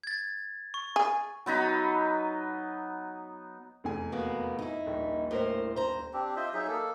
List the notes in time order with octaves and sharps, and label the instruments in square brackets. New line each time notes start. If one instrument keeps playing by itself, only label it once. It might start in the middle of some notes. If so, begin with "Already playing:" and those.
[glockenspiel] G#6 A6
C#6
[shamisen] G#4
[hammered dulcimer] F#3 B3 D#4 B5
[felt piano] F1 E2 G#5
[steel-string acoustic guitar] A#3 B3 F#4
D#4 E4
[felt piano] D#1 A#1
[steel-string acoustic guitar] A2 A#4 C5
C5 A#5
[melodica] C4 D4 G4
F4 C5 D#5 E5
F#3 D#4 G#4 E5
A#3 A4